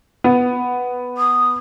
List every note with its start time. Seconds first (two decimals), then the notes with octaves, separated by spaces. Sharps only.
0.24 B3
1.18 D#6